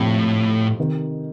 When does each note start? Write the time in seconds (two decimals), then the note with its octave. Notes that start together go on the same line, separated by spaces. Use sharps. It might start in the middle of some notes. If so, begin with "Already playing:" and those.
Already playing: F2 A2 C3 F3
0.80 C3 D#3